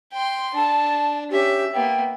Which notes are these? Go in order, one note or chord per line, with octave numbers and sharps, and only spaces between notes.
G5 C6
D4 A5
C#4 G4 E5
A#3 B3 G5